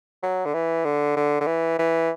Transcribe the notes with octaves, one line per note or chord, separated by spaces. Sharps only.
F#3
D3
E3
D3
D3
D3
E3
E3